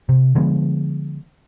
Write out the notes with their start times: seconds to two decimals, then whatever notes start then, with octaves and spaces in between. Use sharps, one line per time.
0.09 C3
0.35 D3 F3 G#3 B3